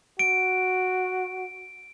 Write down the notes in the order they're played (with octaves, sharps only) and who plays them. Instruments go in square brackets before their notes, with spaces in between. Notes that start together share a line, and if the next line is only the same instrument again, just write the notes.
[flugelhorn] F#4 [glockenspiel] D7